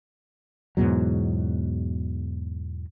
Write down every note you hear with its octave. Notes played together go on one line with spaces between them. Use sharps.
E2 G#2 B2 F#3